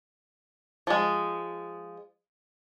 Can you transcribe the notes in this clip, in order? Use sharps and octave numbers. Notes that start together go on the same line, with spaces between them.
F3 G#3